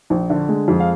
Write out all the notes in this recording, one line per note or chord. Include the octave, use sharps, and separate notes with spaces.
A#1
D3
G#3
F2
F5